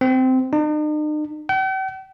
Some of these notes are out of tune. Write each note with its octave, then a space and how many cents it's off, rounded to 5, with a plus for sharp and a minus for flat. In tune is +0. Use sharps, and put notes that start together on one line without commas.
C4 -15
D#4 -45
G5 -45